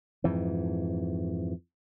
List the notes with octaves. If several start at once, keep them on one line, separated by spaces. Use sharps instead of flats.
F2 G#2 E3